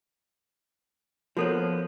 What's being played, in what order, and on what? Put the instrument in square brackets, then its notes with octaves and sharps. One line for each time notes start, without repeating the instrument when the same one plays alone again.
[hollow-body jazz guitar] F3 A#3 B3 [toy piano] F#4 A4 C#5